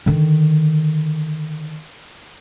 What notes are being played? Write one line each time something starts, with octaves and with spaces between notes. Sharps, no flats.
D3 D#3